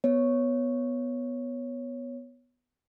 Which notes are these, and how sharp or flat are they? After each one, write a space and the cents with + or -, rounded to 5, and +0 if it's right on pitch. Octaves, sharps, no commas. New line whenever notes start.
B3 +0 C#5 +0